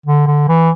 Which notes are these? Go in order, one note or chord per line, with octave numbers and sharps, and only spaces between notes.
D3
D3
E3